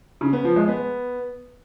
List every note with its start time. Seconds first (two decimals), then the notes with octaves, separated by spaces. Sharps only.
0.21 C#3
0.33 B3
0.44 F3
0.56 G#3
0.68 B3